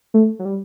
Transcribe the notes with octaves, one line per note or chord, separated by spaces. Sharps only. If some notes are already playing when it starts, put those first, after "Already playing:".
A3
F#3
G3